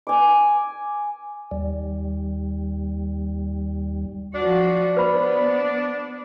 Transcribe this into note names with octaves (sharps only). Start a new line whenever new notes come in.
G#5 D6
D#2 G3
F3 D4 F#4
B3 B4 C5 B5